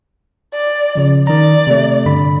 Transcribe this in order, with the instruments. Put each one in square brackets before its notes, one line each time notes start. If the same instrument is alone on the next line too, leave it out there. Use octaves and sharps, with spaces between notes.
[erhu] D5
[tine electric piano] C#3 F3
[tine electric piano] D#3 A#5 [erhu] D5
[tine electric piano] C3 A3
G2 D3 B5